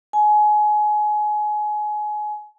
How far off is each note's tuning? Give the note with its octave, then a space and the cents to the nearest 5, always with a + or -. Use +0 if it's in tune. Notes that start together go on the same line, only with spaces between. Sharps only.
G#5 +25